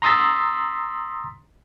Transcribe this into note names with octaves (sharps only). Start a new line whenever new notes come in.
A#5 C6 D#6 E6 A6 B6